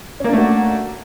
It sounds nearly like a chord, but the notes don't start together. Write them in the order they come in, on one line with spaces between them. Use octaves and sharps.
C#4 A#3 D4 A3 F#4